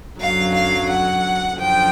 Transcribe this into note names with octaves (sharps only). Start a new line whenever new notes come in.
F#2 D3 F#3 F5
F5
F#5
F#2 D3 F3 G5